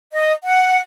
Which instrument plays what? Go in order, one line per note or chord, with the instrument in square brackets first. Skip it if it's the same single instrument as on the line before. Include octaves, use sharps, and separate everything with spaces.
[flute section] D#5
F#5